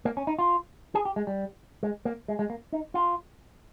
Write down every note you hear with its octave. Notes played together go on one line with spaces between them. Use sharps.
A#3
C#4
D#4
F4
G#4
G4
G#3
G3
G#3
A#3
G#3
G#3
A#3
D#4
F4